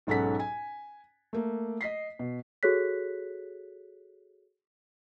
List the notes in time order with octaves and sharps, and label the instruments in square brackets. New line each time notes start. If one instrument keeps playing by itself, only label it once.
[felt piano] B1 G#2 C#4 A4 F#5 B6
G#5
A3 A#3
D#5 B6 C7
B2
[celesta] F#4 G#4 A4 C#5 F#6 B6